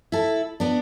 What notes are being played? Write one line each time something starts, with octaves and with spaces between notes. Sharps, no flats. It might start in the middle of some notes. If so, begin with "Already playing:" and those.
E4 A4
B3 D4